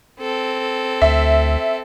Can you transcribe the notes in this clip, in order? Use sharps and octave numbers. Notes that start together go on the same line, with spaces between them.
C4 A4
D2 E5